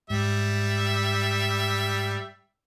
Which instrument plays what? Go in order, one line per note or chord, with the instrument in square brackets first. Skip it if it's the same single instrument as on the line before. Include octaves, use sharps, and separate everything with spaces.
[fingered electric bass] G#2 [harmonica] G3 E5